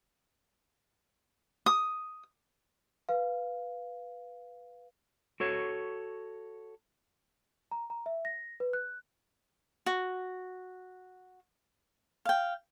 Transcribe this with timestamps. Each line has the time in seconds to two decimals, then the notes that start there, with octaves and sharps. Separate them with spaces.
1.66 D#6
3.09 B4 F5
5.40 F#4 A4 C#5
7.72 A#5
7.90 A#5
8.06 E5
8.25 A#6
8.60 B4
8.73 F#6
9.86 F#4
12.25 F5 G5